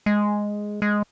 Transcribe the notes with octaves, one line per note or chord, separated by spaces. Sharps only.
G#3
G#3